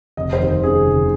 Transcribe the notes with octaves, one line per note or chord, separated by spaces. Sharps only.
F1 D#5
C5
D#2
C#3 G#4
F1